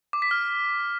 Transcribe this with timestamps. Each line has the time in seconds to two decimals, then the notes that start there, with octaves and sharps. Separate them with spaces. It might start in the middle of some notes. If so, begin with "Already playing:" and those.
0.13 D6
0.22 B6
0.31 F6